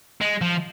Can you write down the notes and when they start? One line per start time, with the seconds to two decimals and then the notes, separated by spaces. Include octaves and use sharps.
0.21 G#3
0.41 F3